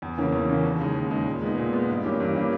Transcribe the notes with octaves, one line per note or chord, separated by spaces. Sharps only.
E2
C#3 E3 A#3 C#4
E2
C#3 E3 A#3 C#4
D#2
C#3 G#3 D#4
D#2
C#3 G#3 D#4
A#2
G#3 B3 D#4
A#2
G#3 B3 D#4
G2
E3 A#3 C#4 G4
G2
E3 A#3 C#4 G4